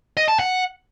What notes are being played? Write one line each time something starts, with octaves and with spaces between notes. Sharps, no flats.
D#5
A5
F#5